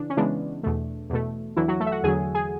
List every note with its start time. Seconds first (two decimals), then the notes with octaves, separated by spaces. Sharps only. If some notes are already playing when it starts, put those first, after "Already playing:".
Already playing: C#3 E3 D4
0.10 C#4
0.17 C#3 E3 G#3 B3 D4
0.63 E2 B2 A3
1.10 E2 B2 A3
1.56 E2 D3 E3 F#3 E4
1.68 F#3 F#4
1.80 A3 A4
1.86 E5
1.92 F#4 F#5
2.03 E2 D3 F#3 G#4 G#5
2.35 G#4 G#5